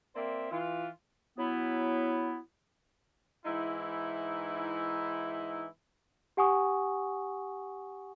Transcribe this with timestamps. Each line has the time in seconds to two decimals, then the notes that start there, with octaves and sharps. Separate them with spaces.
0.15 A#3 C4 C5 D5 E5
0.51 E3 F4
1.38 F#3 B3 E4
3.46 G#2 E3 D#4 E4
6.37 G4 F#5 G#5 C#6 D#6